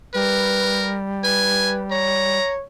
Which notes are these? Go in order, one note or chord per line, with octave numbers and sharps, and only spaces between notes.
G3 A#4 B4
B4 G#5
C#5 A#5